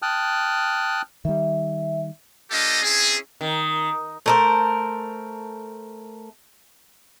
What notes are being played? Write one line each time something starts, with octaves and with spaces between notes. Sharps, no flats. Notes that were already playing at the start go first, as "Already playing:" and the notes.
G5 A5 D#6 F6 F#6
D#3 G3 E5
A#3 D4 F4 G4 A4 D#5
C4 C#4 E4 G#4
D#3
A3 A#4 C5